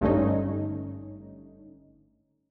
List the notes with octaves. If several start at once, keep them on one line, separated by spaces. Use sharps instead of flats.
G#1 G2 D3 A3 C#4 D#4